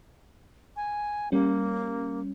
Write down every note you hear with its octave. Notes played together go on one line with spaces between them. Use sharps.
G#5
G3 A#3 C#4